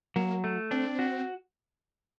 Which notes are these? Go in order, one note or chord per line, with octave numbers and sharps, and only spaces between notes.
F#3 A#3
A3
C4 D4
F#4